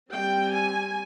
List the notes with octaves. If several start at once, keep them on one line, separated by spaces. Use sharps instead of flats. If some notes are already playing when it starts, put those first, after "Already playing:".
G3 C4 G5
G#5